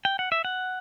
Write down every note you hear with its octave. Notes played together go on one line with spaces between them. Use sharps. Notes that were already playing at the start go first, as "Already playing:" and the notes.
G5
F#5
E5
F#5